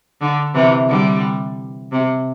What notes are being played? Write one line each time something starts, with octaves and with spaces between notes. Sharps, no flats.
D3
C3 E3
D3 G3
C3